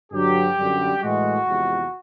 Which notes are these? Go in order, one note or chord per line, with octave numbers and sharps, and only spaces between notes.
G2 D3 F#3 G4
F#2 D3 G3
A2 E3 G#3 F#4
E2 C3 F3 G#3